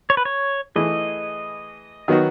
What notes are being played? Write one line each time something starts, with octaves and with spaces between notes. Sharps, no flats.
C#5
B4
C#5
E3 A3 E4 G#4 D#5
D#3 F#3 B3 D#4 F#4